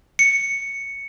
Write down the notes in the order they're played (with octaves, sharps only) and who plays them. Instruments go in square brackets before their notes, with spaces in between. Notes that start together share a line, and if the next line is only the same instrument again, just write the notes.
[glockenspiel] C#7